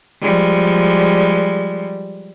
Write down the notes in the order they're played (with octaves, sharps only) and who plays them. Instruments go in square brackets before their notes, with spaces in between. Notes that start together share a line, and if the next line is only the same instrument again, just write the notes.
[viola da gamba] F3 G3 G#3